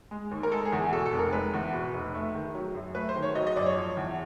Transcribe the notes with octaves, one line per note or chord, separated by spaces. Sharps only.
G#3
D#2
A#4
G#3 A4
G#4
E2
G#4
B2 A4
A4
F1
A#4
G#3 B4
E2
B2
F1
A3
D#3
F#3
F#2
A3 B4
C5
D#3
C#5
F#3 D#5
D#5
F#2 D5
C#5
F3
E2